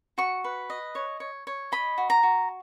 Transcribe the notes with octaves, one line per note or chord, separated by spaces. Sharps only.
F#4 C#6
B4
D#5
C#5
C#5
C#5
D#5 B5
F#4
A#5
F#4